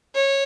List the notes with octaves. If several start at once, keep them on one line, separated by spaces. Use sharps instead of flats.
C#5